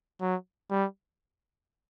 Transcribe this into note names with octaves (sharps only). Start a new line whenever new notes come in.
F#3
G3